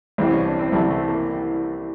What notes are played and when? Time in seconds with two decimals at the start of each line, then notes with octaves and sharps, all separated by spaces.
0.18 C2 C3 E3 G3 C4
0.32 C#4
0.45 D4
0.59 C4
0.72 C2 C3 E3 G3 A3
0.90 A3
1.08 A#3